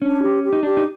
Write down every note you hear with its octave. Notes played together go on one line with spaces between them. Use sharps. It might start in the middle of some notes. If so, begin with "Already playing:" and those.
C#4 D4
G4
G4
D#4
D4 G4
D#4